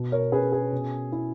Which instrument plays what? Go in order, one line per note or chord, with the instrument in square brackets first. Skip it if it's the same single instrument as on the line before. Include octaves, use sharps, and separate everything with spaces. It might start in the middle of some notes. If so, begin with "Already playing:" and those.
Already playing: [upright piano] B2
A#4 C#5
C#4 G#4 B4
G#4
B2
E4